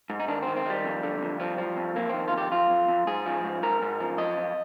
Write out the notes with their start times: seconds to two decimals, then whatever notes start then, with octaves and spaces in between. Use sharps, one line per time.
0.10 G#2
0.20 D#4
0.28 D#3 D4
0.42 C4
0.47 D#3
0.56 C4
0.65 D#3 G3
0.85 F2
1.03 D3
1.22 F2
1.40 F3
1.58 F3
1.77 F2
1.96 F2 A#3
2.09 D#3 C4
2.28 F4
2.33 F2 G4
2.52 F2 F4
2.70 F2
2.88 F2
3.07 G#2 G#4
3.25 F3
3.44 G#2
3.63 G#2 A#4
3.82 G#2
4.00 F3
4.18 F2 D#5
4.37 F2